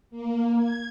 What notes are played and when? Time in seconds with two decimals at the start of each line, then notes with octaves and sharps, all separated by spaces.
0.11 A#3
0.57 G#6